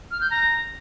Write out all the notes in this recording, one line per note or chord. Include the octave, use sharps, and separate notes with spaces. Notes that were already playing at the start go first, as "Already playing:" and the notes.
F6
G6
A#5